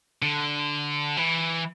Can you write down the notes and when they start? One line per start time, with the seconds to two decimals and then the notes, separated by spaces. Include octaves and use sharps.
0.22 D3
1.17 E3